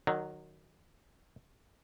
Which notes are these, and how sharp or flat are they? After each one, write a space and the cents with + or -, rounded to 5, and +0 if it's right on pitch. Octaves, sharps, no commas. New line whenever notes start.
D#3 -25 F#3 +0